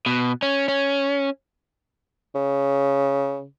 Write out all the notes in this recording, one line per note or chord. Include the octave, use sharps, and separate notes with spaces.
B2
C#4
C#4
C#3